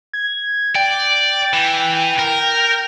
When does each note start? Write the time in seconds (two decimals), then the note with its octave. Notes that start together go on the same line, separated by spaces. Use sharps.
0.13 G#6
0.75 D5 G5
1.53 E3
2.19 A#4